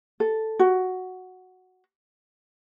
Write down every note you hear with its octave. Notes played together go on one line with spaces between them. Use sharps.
A4
F#4